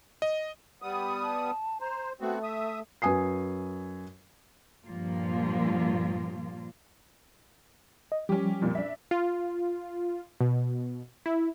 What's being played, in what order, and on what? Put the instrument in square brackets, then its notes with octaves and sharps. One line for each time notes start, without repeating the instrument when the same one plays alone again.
[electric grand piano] D#5
[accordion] G3 B3 D#6
[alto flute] A5
[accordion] C5 [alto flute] A#5
[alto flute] A3 [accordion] B3 C4 F#4
[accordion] E5 D#6
[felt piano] F#2 B4 G#5 D#6 C7
[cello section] G2 A#2 F3 A#3 F4
[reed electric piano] D#5
[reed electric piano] F3 G3 [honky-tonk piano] C#4 G4
[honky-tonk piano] F2 A#2
D4 E5
[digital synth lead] F4
B2
E4